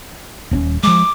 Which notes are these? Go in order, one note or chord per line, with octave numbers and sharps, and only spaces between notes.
D#1 C4 C#4
F3 G#3 D6